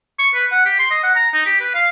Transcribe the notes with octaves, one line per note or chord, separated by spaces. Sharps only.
C#6
B4
F#5
G4
C6
D#5
F#5
A#5
D#4
G4
B4
F5